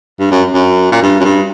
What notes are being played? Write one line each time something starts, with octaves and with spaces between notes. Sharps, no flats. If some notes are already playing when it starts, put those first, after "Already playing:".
G2
F#2
F#2
A#2
G2
F#2
G2